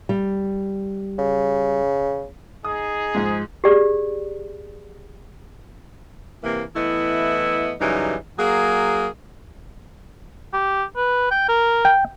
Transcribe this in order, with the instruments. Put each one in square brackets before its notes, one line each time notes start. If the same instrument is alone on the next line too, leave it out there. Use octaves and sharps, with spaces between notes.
[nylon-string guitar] G3
[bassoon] C#3
[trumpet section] D#4 G#4 [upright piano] D#6
[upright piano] G#2 F3 G#3
[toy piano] G4 G#4 D5
[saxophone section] C3 E3 A#3
E3 A3 B3 E4 D#5
F#2 C#3 E3 G3 D#4
F#3 A#3 G#4
[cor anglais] G4
B4
G5
A#4
[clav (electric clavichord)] G5